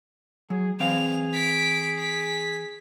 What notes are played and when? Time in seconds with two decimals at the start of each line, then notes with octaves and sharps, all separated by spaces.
0.50 F#3 G#4
0.80 E3 C4 G#4 F5 F7
1.34 B6 D7
1.99 B6